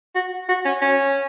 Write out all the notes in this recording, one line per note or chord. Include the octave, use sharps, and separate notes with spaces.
F#4
F#4
C#4
C#4